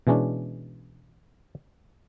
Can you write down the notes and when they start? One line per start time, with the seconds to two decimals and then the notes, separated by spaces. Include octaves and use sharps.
0.07 B2 E3 G#3 C#4 D4